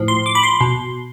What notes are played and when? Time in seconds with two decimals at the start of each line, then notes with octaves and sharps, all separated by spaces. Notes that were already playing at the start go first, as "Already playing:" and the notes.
Already playing: A2 F3
0.08 C6
0.26 D6
0.35 B5
0.43 C6
0.61 B2